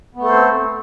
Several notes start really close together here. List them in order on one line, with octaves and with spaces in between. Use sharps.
B3 A3 A4 C5 C4